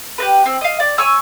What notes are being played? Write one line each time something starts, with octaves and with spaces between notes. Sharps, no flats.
G4 A#4 B4
C4
D#5 F5
D5
C#5 G#5 C#6 E6